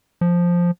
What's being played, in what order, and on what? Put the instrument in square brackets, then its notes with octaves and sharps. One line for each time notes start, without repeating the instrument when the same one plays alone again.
[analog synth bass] F3